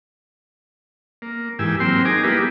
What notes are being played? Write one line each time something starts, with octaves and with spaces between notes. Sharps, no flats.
A#3
G#2 E3 G4 G#5 E6
F#3 A#3 C4 G5 C6
D#4 G#4 G#5 A#5 D6
G3 A#3 B3 E4 G4 G#4